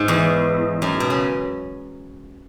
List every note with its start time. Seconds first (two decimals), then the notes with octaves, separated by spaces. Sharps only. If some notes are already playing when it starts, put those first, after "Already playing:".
Already playing: G#2
0.08 E2
0.82 F#2
1.00 B2
1.10 C#3